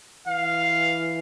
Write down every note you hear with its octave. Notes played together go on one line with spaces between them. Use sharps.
E3 F5